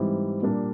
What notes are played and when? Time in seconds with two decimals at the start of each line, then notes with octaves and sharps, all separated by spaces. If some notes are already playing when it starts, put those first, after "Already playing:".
Already playing: G#2 E3 G3 C4 D#4
0.42 A#2 G3 A#3 D4